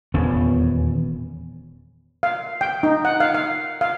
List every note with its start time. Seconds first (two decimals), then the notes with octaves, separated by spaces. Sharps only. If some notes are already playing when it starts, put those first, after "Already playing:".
0.14 D#1 E2 B3 C#4
2.23 F5
2.61 G5
2.83 D#4
3.05 F#5
3.20 F5
3.34 F5
3.81 F5